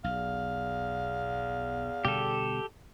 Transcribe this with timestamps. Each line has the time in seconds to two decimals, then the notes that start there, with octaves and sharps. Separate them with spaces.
0.04 B1 E2 F5
2.05 B2 D3 G3 G4 A4